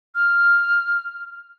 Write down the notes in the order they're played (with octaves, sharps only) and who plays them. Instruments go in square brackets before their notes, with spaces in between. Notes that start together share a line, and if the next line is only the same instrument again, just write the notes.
[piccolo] F6